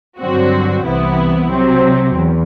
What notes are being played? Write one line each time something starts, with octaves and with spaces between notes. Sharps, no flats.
G2 D3 F#3 C4 F#4
C2 C3 E3 B3 E4
C3 F#3 C4
E2